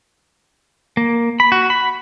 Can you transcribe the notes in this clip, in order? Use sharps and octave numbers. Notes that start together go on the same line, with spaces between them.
A#3
B5
F#4
B5